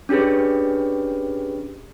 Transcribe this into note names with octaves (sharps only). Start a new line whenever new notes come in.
C#4 D4 G4 G#4 B4